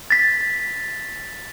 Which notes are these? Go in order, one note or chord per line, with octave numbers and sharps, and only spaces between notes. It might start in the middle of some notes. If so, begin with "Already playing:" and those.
A6 B6